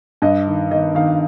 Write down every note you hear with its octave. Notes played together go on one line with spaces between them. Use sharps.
G2 D#5
D#3
D#3 D#5
D#3 F5